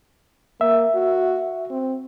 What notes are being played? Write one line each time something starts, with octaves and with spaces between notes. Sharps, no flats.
A#3 E5
F#4
C4